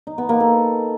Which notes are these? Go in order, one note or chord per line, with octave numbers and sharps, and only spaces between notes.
D#4
B3
A#3
A4